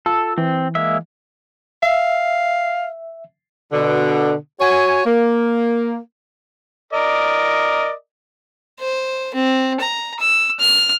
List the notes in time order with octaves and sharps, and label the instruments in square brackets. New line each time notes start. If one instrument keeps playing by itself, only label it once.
[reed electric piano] F4 A5 E6 [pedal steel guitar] A4
[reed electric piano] E3 [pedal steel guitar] C4
[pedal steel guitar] G#3 A#3 E5
[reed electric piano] E5 [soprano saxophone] F5
[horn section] B2 D3
F#4 C#5 G#5
A#3
[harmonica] A#4 D5 D#5
[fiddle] C5
C4
A#5
E6
F6